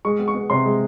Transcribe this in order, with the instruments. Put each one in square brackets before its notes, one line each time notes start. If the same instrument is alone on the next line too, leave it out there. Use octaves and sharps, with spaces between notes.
[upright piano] G#3 [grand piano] C#6
[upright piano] B3
[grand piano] C#6
[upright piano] B3
[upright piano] C3 [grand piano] C6
[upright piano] G#3